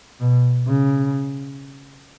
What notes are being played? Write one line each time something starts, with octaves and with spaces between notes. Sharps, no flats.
B2
C#3